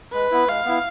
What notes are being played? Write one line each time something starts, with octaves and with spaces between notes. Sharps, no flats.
G#3 B4
B3 E4
G#3 F5
B3 E4